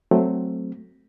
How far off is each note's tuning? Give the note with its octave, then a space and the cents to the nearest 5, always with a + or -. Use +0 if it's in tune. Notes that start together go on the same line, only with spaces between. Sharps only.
F#3 +0 A3 +5 C4 +0